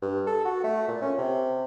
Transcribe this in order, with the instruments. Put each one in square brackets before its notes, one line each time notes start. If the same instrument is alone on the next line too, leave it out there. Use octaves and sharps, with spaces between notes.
[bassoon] G2
A4
F#4
A3
A#2
C#4
C3